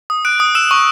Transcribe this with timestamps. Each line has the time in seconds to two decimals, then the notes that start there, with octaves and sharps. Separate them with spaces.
0.10 D#6
0.25 F#6 D7
0.40 D#6
0.55 E6 E7
0.71 C#6